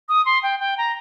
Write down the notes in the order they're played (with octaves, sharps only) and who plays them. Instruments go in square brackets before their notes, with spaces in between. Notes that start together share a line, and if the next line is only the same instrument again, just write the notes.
[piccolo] D#6
C6
G5
G5
A#5